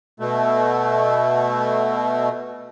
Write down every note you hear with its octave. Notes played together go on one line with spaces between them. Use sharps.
B2 A3